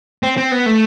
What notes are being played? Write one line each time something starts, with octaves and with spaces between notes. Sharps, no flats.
C4
C4
B3
A3